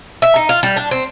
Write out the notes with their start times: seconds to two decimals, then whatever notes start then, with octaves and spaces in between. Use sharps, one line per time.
0.22 E5
0.36 D#4
0.49 F4
0.63 G3
0.76 D4
0.91 C4